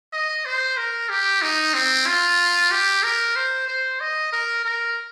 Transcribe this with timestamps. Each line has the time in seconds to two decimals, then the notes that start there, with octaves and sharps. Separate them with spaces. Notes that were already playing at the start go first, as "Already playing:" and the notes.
0.13 D#5
0.45 C5
0.77 A#4
1.09 G4
1.42 D#4
1.74 C4
2.07 F4
2.71 G4
3.03 A#4
3.36 C5
3.68 C5
4.00 D#5
4.32 A#4
4.65 A#4